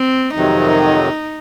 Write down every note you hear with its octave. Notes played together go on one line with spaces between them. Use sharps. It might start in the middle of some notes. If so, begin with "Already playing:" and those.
Already playing: C4
F2 C3 D#3 F#3 D#4